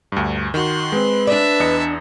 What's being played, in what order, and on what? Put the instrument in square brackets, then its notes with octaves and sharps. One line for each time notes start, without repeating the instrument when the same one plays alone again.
[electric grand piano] D2 G2
[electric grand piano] D#3 F#4 [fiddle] C6 F#6
[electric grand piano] G#3 C4 [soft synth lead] B4
[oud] D4 D5 [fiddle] E5 A5
[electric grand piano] E2 D#5 C#7